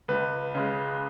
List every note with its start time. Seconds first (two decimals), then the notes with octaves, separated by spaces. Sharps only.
0.08 C#2 B4
0.55 C#3 G#3